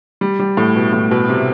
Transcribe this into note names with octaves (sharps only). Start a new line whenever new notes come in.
G3
G3
A2
B2
A2
B2
C3